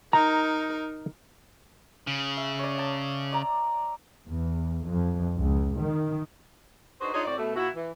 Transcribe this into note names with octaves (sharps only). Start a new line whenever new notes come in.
D#4 A#4 A#5
C#3
E5
C#5 D5
A5
D5 A#5
E2
F2
C#2
D#3
D4 D#4 F#4 G#4 B4 C5
D4 D#4 F4 G#4 C#5 D#5
A2 C4 F#4 D5
B2 A3
A#2 E4 F#4
E3